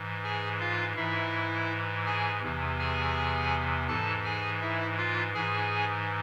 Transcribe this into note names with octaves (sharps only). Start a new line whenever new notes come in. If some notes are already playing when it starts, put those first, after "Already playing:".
Already playing: G#2 E3
G#4 G#5
F4 F5
G#2 E3 E4 E5
G#4 G#5
E2 C3 E3
G#4 G#5
G#2 E3 A4 A5
G#4 G#5
E4 E5
F4 F5
G#2 E3 G#4 G#5